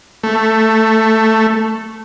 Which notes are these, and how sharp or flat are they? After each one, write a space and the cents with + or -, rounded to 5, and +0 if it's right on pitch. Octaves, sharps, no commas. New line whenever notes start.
A3 +5